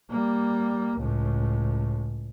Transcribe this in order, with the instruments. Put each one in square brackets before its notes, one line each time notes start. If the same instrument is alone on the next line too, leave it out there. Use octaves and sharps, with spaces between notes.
[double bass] G3 A#3
C#2 A2